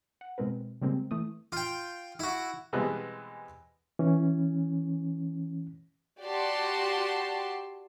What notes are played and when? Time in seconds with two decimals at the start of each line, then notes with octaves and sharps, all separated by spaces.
0.21 F#5
0.38 B2 G#3 C4 A#4 B4
0.82 C#3 G3 G#3 A#3 C4
1.11 E3 A3 D#6
1.52 F4 G5
2.20 E4 F#4
2.73 B2 E3 G3 G#3 B3 C4
3.99 E3 C#4
6.23 F#4 G4 D5 A5 C6